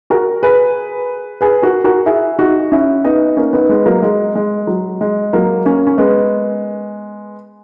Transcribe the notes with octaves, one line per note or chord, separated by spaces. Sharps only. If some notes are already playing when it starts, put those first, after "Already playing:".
F#4 A#4
G#4 B4
G#4 B4
F#4 A#4
F#4 A#4
E4 G#4
D#4 F#4
C#4 E4
B3 D#4
A#3 C#4
B3 D#4
G#3 B3
F#3 A#3
G#3
G#3
F#3
G#3
F#3 A#3
A#3 C#4
C#4
G#3 B3